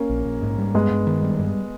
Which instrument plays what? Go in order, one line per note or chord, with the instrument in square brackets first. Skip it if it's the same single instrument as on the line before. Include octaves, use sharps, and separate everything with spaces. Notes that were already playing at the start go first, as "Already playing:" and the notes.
Already playing: [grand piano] A#3 C#4
[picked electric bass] A#1
A#1
G#2
G3
[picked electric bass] G2 [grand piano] G#3 B3
[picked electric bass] G2
D#3
G3
G2